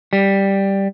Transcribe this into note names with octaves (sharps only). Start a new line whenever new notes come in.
G3